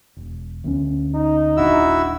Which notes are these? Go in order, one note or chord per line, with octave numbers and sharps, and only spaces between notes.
E1
D2 G#3 C#4
D#4
D#1 G#1 D4 E4 F#4 E6